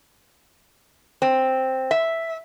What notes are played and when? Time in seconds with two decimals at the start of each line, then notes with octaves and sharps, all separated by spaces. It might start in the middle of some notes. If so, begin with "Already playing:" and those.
1.22 C4
1.91 E5